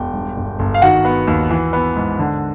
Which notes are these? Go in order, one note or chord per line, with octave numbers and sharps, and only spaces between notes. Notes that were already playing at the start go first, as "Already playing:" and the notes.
Already playing: E1 G5
G2
G1
G1
F5
D#3 F#4 F#5
B3
D#2
E3
B3
G#2
D3